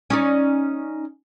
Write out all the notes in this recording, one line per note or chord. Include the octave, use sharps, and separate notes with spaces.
C#4 D#4 D5